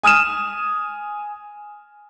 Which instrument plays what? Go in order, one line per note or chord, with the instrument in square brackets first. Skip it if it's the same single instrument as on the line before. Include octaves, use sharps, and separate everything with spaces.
[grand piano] G#5 D#6 F6 D#7 E7